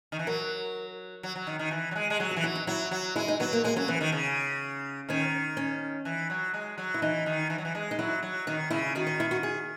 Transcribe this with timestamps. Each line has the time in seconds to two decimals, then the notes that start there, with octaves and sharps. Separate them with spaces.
0.12 D#3
0.19 E3
0.27 F#3 A#4
1.23 F#3
1.36 F#3
1.47 D#3
1.59 D#3
1.71 E3
1.91 F#3
1.95 G#3
2.10 G#3
2.20 F#3 G#4
2.31 F#4
2.37 E3
2.43 F#3 E4
2.55 D#4
2.67 F#3 E4
2.91 F#3
3.16 G#3 E4
3.28 D#4
3.40 F#3 B3
3.53 A#3
3.64 G#3 A#3
3.76 F#3 C#4
3.88 E3 B3
4.01 D#3
4.12 C#3
5.09 D#3 C#4
5.57 C#4
6.05 E3
6.30 F#3
6.54 G#3
6.78 F#3
6.94 E4
7.02 E3 D#4
7.26 D#3
7.50 E3
7.58 F#3
7.65 E3
7.75 G#3
7.91 D#4
7.99 F#3 E4
8.23 F#3
8.47 D#3 D#4
8.70 C#3 E4
8.95 D#3 F#4
9.07 D#4
9.20 E4
9.31 F#4
9.43 G#4